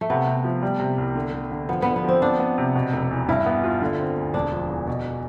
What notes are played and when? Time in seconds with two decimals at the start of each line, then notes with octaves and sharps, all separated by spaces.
0.01 A3
0.10 C3 B3
0.28 C3
0.44 F3
0.62 G3
0.80 C3
0.98 C2
1.15 D3
1.33 D3
1.52 D3
1.69 F3 B3
1.82 D3 B3
1.96 B3
2.04 F3 C4
2.22 B3 D4
2.40 B3
2.58 C3
2.75 B2
2.93 F1
3.11 E2
3.29 G2 E4
3.46 B3
3.64 F4
3.82 D3
3.99 C4
4.17 D2
4.34 E1 D4
4.52 F3
4.70 E2
4.87 B2